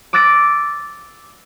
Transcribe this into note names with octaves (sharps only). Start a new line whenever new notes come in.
D6 E6 F#6 A6 A#6 D7